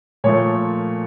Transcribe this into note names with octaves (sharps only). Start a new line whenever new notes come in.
A#2 F3 A3 C#5